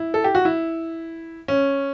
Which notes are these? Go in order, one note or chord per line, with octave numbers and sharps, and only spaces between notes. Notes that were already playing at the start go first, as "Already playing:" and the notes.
Already playing: E4
A4
G4
F#4
E4
C#4